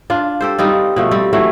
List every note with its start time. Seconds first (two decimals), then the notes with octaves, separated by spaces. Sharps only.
0.10 D4 F4
0.41 G4 A4 C5
0.58 G3 C4 D#4 F4
0.96 B2 F3 A3
1.11 G3 C4
1.33 E3 F#3 A3